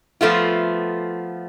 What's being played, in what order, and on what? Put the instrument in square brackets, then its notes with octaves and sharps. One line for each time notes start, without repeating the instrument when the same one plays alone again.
[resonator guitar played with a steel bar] F3 A3 B3 F4